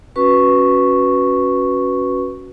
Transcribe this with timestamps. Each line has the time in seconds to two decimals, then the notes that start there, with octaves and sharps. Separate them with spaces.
0.16 C#4 F#4 B4 C#6